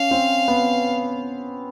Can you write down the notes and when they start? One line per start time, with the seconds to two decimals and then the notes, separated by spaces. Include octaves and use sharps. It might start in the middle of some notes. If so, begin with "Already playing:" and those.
Already playing: C#4 F5
0.11 C4
0.48 B3